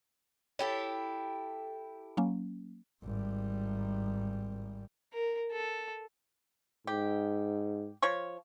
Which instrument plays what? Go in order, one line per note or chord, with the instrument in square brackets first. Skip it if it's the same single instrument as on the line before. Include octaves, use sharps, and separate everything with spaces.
[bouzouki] E4 G4 A4 [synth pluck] C#5
[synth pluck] F#3 A#3 C#4
[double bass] G#1 G3
[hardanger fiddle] A#4
A4
[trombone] G#2 [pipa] G4
[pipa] F3 C#5 C#6